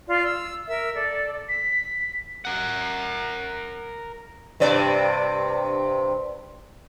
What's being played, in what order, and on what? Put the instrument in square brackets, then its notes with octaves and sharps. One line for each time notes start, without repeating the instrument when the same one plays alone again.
[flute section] F4 D5
E6
A#4 E5 E6
A4 D5
[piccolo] B6
[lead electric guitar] A#4 F#5
[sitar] G2 C3 D5